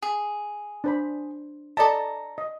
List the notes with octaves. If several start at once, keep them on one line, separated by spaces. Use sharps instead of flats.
G#4
D4 C5 B5
A4 D5 D#5 A5 A#5
D#5